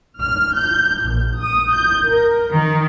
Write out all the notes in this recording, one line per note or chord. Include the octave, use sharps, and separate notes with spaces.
F6
G6
A#1
D#6
G6
A#4
D#3